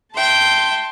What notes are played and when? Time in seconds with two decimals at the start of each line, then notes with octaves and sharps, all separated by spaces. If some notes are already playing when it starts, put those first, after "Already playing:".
0.15 E5 G5 A5 C6